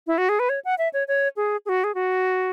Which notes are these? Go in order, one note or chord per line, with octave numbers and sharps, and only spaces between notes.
E4
F#4
G#4
B4
C#5
F#5
E5
C#5
C#5
G#4
G#4
F#4
G#4
F#4